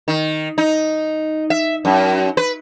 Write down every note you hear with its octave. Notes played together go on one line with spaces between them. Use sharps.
D#3
D#4
E5
F#2
B4